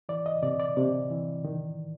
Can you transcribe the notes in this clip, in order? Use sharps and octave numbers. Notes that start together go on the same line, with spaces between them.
E3 D5
D#5
C3 D5
D5
C3 D5
E3
D#3